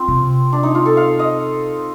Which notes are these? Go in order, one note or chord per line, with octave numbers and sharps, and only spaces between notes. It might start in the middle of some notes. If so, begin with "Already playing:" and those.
Already playing: C4 F4
C3
D4
D#4
F4
A4
F5
D#5